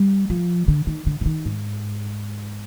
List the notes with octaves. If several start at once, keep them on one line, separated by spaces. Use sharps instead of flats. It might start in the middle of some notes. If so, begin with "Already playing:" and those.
Already playing: G3
F3
D3
D#3
D3
D3
D#3
G#2